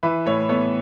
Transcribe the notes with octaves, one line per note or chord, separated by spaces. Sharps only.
E3 B4 E5
A2 A4 C#5
B3 A4 C#5